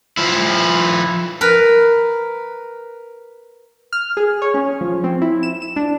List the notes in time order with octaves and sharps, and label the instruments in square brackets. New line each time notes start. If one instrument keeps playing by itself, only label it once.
[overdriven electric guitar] F3 E4
[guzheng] A#4 B4
[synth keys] F6
G#4
C#5
C#4
F3
C4
E4
E7
E7
D4